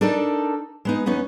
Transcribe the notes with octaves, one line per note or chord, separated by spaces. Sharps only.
D4 D#4 A4 A#4 D5
G#3 B3 D#4
E2 B3 C#4 D#4